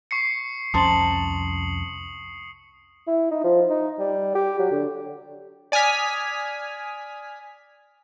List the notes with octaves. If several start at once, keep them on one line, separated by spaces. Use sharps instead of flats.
C#6 C7 C#7
C2 F2 C#4 A#4 C5 A5 D#6 F#7
E4
D#4
F3
D#4
G3
G4
F#3
D3
D5 G#5 D#6 F6 B6